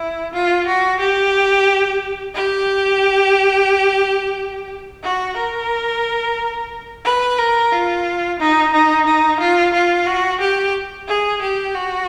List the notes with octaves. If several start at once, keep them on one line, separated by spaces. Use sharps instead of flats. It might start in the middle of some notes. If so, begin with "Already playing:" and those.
Already playing: E4
F4
F#4
G4
G4
F#4
A#4
B4
A#4
F4
D#4
D#4
D#4
F4
F4
F#4
G4
G#4
G4
F#4